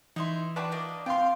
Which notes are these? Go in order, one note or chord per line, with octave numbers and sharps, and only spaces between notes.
E3 D#4 E4 E5 C6
D4 F#4 B4 D5 G5 A5
A#3 D4 D#5
C4 F4 F5 G5 C6